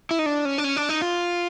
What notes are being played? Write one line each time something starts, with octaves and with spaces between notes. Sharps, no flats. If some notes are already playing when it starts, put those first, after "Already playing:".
E4
D#4
D4
C#4
D4
C#4
D4
D#4
F4